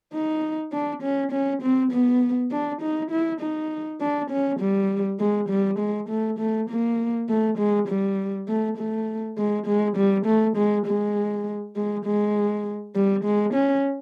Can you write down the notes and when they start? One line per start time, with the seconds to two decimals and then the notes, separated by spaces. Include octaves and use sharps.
0.14 D#4
0.73 D4
1.03 C#4
1.32 C#4
1.63 C4
1.92 B3
2.51 D4
2.82 D#4
3.12 E4
3.41 D#4
4.01 D4
4.31 C#4
4.60 G3
5.20 G#3
5.50 G3
5.79 G#3
6.09 A3
6.40 A3
6.70 A#3
7.29 A3
7.58 G#3
7.89 G3
8.48 A3
8.78 A3
9.38 G#3
9.67 G#3
9.96 G3
10.26 A3
10.57 G#3
10.87 G#3
11.76 G#3
12.05 G#3
12.95 G3
13.25 G#3
13.54 C#4